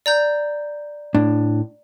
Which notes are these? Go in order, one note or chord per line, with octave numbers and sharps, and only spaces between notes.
D5 A#5 G6
A2 D4